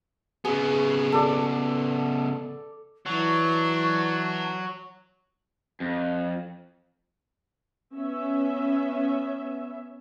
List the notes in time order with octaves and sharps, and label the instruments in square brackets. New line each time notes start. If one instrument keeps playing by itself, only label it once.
[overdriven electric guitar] C#3 B3 [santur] G#4
[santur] A4 D5
[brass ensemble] E3 [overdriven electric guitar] F#3 [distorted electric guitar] D4 [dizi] C#6
[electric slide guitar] F2
[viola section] B3 C#4 E5